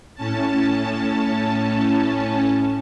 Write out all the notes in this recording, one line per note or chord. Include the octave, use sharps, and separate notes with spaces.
A2 C#4 A5